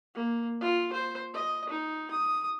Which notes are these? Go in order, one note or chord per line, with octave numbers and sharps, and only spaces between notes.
A#3
F4
C5
D#5
D#4
D#6